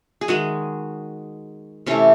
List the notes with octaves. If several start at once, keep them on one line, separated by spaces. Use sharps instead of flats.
G#4
D#3 G#3 F#4
C3 E3 A3 C#4